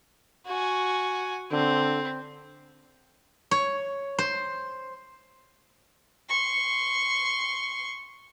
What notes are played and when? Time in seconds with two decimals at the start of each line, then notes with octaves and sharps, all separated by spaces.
0.47 F#4 G#5
1.51 D3 C4
3.51 C#5
4.19 C5
6.29 C6 C#6